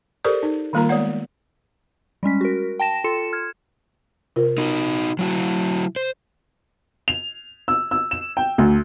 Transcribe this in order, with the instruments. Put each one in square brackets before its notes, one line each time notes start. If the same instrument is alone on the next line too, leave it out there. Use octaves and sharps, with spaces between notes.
[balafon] G4 A4 A#4 C5 D5
D#4
D#3 G3 A#3 F4 A#4 A#5
G#3 B3 C#5 D5 F#5
[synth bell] G3 G#3 C#4 B6
F#4 A#4
G5 A5 A#6 E7
F4 A4 C6 C#7 E7
F6 G#6
[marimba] C3 F4 A#4
[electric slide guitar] D#4 F#4
F#3 E4 F#4
C5
[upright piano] F7
E6
E6
E7
G5
D2